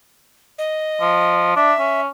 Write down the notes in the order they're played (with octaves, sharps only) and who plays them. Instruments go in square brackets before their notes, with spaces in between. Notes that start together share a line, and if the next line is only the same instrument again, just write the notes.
[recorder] D#5
[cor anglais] F3
[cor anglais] D4 [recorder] E5
[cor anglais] C#4